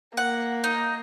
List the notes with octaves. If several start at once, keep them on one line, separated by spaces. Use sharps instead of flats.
A#3 F#5
D#4